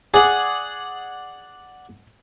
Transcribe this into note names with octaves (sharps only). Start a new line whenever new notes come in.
G#4 D5 F#5